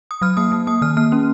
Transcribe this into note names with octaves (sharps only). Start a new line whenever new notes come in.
D#6
F#3 F6
A#3 D#6
A#3
A#3 D#6
D#3 F6
A#3 F6
C#4